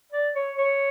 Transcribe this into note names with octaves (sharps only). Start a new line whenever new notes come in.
D5
C#5
C#5